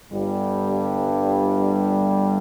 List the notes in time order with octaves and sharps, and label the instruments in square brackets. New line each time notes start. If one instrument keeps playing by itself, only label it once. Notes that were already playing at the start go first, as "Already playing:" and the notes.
[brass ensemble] G1 G2 G3